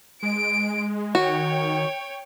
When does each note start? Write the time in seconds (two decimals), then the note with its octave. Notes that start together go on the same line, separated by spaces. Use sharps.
0.23 G#3 D7
1.15 D#3 F#4 C#5 G5